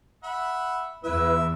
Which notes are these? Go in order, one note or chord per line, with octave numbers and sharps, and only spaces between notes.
E5 F#5 B5
E2 E4 B4 E5 E6